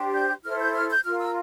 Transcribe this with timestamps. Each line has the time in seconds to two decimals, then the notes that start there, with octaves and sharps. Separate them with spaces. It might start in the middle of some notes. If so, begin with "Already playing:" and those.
Already playing: D4 G4 C5
0.13 G6
0.44 E4 A4 C5 F6
0.60 G6
0.74 F6
0.90 G6
1.04 F4 A#4 F6
1.20 E6